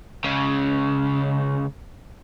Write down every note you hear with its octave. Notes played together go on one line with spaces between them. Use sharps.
C#2 C#3